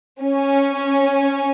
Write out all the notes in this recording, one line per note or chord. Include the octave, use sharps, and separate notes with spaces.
C#4